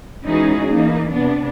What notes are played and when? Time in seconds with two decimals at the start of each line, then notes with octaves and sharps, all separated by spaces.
0.24 E3 G#3 C#4 D#4 F#4 G#4
0.68 E3 A#3 D#4
1.11 C3 B3 D4